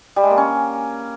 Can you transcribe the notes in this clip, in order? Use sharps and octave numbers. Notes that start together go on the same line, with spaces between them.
G3
G#3
A#3
C#4